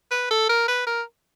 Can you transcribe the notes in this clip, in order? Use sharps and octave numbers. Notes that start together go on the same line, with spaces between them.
B4
A4
A#4
B4
A#4